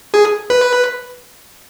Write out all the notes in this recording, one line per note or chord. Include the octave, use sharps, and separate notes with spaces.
G#4
B4